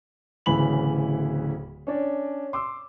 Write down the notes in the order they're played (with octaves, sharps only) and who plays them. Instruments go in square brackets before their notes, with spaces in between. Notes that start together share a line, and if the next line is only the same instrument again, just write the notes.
[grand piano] D1 D2 C#3 E3 B5 F#7
C#4 D4 D5
C6 D6 E6